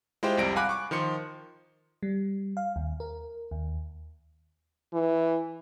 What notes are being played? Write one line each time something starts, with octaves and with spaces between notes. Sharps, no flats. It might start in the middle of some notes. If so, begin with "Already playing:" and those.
G#3 E4 F4 G4 C5 G5
C2 F2 C3 G3 A#6 D7
F5 F#5 G#5 B5 D6 F#6
C#6 D6
D#3 F3 C6 C#7
G3
F5
D#2
A#4
D#2
E3